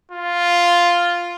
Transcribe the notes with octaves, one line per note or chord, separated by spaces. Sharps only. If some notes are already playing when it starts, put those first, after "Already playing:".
F4